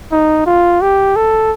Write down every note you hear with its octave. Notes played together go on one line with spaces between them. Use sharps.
D#4
F4
G4
A4